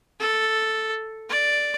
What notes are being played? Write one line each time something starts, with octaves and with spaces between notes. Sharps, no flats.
A4
D5